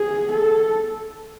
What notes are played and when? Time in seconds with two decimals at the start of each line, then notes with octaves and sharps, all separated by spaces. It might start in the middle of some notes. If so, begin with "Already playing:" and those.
Already playing: G#4
0.31 A4